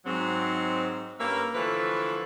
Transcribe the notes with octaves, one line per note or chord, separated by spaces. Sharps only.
G#2 F#3 C4
G2 A#3 C#4 A#4 E5
D3 E3 F3 A3 E4 B4